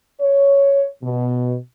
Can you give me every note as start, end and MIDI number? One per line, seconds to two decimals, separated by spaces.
0.21 0.87 73
1.03 1.56 47